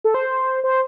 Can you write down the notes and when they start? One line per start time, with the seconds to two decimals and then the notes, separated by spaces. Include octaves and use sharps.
0.04 A4
0.14 C5
0.64 C5